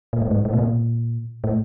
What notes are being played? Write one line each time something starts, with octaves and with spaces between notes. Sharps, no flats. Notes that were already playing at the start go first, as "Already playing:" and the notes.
A#2
A2
G#2
A2
B2
A#2
A2